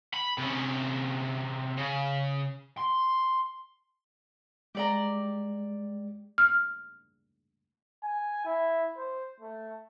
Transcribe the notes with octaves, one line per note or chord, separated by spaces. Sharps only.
B5
C3 C#4
C#3
C6
G#3 G4 D5 A#5
F6
G#5
E4
C5
A3